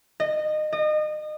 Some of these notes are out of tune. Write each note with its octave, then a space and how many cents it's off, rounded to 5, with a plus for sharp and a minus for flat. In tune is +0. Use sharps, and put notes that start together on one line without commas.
D#5 -25
D#5 -30